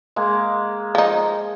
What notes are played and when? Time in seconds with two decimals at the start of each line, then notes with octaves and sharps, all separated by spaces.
0.16 G#3 A#3
0.95 F3 D#4